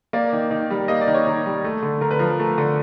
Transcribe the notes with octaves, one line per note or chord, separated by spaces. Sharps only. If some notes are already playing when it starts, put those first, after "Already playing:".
A#3 D5
D#3
D#3
G3
A#3 D#5
D5
D#3
C#5
D#3
G3
A3
D3
D3 A#4
B4
F3 A#4
A3
D3